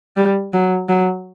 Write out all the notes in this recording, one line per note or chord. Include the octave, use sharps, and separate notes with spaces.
G3
F#3
F#3